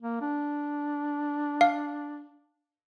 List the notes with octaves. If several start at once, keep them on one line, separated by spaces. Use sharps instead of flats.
A#3
D4
F5